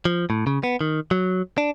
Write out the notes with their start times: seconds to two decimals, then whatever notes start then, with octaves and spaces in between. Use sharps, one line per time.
0.05 F3
0.30 A2
0.47 C#3
0.63 B3
0.81 D#3
1.11 F#3
1.58 D4